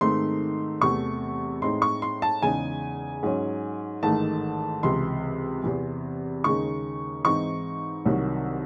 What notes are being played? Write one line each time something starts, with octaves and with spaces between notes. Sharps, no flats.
G#2 D#3 A3 C4 D#4 C6
E2 C3 E3 A3 C#6
A2 G#3 C4 D#4 C6
C#6
C6
A5
E2 C#3 G#3 D#4 G#5
G#2 F#3 C#4
A1 G#2 D#3 A3 A5
C#2 C3 E3 C6
E2 C3 E3
D#2 C#3 G#3 D#4 C#6
G#2 E3 C4 D#4 C#6
C2 C3 D#3 F#3